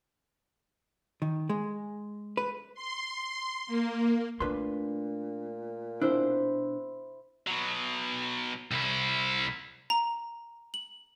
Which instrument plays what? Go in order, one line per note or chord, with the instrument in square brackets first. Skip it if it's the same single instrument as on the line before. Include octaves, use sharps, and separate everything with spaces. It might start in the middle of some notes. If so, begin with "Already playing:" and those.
[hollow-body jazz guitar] D#3
G#3
B4
[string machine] C6
A#3
[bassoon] A#2 [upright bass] A3 [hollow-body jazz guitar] D4 B4 C6
[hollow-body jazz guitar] B2 C4 D4 [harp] E4 C5
[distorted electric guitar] B2 F#3
C2 E4
[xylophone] A#5
F#7